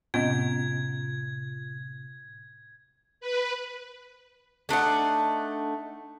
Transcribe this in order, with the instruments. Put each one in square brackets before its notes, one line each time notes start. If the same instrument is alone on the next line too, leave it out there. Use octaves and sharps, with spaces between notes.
[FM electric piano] A2 C3 [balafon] B3 C#4 D#5 [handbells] F4 [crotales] G#6
[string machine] B4
[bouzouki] A3 D4 D#4 F#5